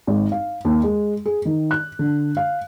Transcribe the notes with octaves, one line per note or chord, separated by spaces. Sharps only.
G#1
F5
D#2
G#3
G#4
D#3
F#6
D3
F5